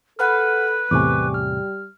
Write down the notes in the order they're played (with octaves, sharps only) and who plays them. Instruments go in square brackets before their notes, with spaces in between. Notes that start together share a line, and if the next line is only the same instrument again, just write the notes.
[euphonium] A4 [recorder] B4 [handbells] F#5 B5 F6
[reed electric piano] E2 A2 C3 [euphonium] G3 [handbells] G#5 C#6 D6
[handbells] F6